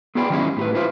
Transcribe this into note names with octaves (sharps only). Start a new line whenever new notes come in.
B3 F4 G#4 D5 G5 B5
D#3 F#3 G#3 C#4 E4 G4
A2 G4 B4
E4 F4 B4 C5